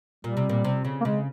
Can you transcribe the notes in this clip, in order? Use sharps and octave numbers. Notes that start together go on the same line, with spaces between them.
A#2 G3
C3
A#2
C3
C#3
A#3
C#3 G#3